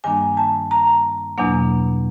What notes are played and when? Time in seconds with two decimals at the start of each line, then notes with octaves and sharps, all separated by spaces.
0.04 G2 D#3 G3 A#3 D4 G#5
0.37 A5
0.71 A#5
1.38 E2 B2 F#3 A#3 D4